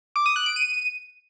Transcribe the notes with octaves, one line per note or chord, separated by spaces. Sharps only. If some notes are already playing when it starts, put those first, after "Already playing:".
D6
D#6
F#6
D7
D#7